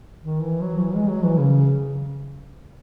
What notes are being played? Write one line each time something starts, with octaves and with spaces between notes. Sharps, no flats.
D#3
E3
F#3
E3
G#3
F#3
E3
C#3